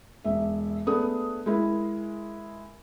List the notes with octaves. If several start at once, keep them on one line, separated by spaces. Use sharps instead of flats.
E1 E5
A3 B3 D4 G#4 D#6
G#3 E4 A#4